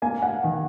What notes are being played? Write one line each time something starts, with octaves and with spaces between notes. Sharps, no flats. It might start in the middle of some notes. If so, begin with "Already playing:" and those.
A#3 G#5
F#5
D#3